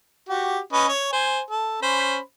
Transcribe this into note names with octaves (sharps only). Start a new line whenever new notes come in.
F#4 G4
C#4 B4 D#5
C#5
C5 G#5
A4
C#4 C5 B5